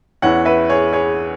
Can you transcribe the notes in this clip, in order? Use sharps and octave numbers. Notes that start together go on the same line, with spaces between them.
E2 E3 C#4 E4 C#5 F#5
B4 E5
G#4 C#5
G#4 C#5